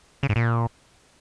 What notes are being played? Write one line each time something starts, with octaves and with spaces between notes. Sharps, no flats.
C#3
G#2
A#2